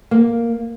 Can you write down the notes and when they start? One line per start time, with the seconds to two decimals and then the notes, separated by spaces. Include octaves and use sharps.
0.11 A#3